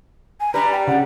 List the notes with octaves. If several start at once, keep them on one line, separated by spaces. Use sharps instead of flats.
G#5
G3 D4 B4 A#5
G5
C#3 F#5